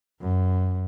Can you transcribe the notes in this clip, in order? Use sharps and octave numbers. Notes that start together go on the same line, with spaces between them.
F#2